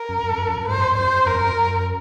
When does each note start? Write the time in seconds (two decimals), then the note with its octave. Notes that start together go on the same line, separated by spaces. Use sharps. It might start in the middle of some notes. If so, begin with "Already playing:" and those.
Already playing: A#4
0.09 F#2
0.23 F#2
0.38 F#2
0.48 F2
0.58 F#2
0.68 G#2 C5
0.77 F#2
0.87 F2
0.97 F#2 C5
1.26 F2 A#4
1.41 F#2